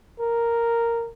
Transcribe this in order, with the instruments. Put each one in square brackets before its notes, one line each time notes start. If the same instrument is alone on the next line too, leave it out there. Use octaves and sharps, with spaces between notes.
[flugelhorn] A#4